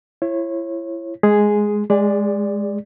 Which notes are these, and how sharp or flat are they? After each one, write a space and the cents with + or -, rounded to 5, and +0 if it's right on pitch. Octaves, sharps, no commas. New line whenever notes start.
E4 +30 C#5 -30
G#3 +5 G#4 +0
G#3 +0 G#4 -35 D5 +0